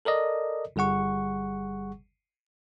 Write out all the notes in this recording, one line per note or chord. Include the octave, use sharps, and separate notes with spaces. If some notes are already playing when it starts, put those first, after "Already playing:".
A4 A#4 D5 D#5
G1 G3 G#4 F#5 C#6